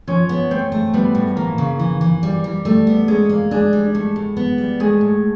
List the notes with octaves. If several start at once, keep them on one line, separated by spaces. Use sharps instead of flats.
F3 C#4 C#5
B3
A3 C4 C5
A3
G3 B3 B4
A2
E3 A#3 A#4
C#3
E3
E3
G3
G3
G3 A3 A4
B3
G#3 C#4 G#4
A#3
G#3 D4 G#4
G3
A3
A2
B3
G3
G#3 A3 G#4
A2